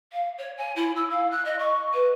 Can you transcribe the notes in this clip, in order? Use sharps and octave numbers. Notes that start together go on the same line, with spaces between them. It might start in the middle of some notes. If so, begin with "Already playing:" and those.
F5
C#5
G#5
E4
E6
F5
F#6
D#5
C#6
B4